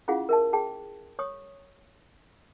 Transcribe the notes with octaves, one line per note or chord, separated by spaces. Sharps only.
C#4 E4 F4 G#4 F5 F#5
A#4 E5 A5
G#4 G5 A5
C#5 C#6 D#6